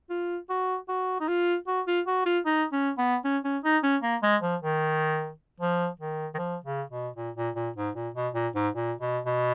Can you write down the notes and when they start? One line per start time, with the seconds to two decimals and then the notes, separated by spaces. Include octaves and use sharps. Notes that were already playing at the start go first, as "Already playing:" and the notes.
0.10 F4
0.50 F#4
0.89 F#4
1.20 D#4
1.28 F4
1.68 F#4
1.87 F4
2.07 F#4
2.26 F4
2.46 D#4
2.72 C#4
2.98 B3
3.24 C#4
3.44 C#4
3.64 D#4
3.83 C#4
4.03 A#3
4.23 G#3
4.42 F3
4.62 D#3
5.60 F3
5.99 D#3
6.34 D#3
6.38 F3
6.64 C#3
6.90 B2
7.16 A#2
7.36 A#2
7.56 A#2
7.77 G#2
7.95 A#2
8.15 B2
8.34 A#2
8.55 G#2
8.74 A#2
9.01 B2
9.26 B2